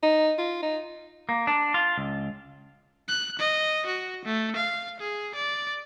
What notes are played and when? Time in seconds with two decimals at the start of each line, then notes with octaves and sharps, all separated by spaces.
0.03 D#4
0.38 F4
0.62 D#4
1.29 A#3
1.47 D4
1.74 F4
1.98 C#2
3.08 F#6
3.39 D#5
3.86 F#4
4.25 A3
4.56 F5
5.00 G#4
5.35 D5